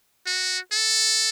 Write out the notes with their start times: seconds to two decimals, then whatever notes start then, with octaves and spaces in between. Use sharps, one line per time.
0.26 F#4
0.72 A4